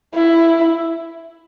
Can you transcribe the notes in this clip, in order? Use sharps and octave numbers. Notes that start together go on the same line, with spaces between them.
E4